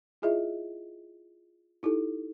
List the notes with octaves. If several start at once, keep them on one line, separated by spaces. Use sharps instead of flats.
E4 F4 G#4 D#5 E5
D#4 E4 G4 A4